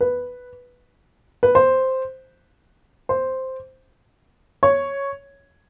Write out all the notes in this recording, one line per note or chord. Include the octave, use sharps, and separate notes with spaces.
B4
B4
C5
C5
C#5